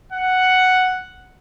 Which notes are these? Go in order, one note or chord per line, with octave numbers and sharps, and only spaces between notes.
F#5